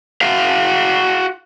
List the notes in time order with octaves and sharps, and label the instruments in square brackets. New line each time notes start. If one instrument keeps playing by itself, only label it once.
[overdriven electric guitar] F#4 F5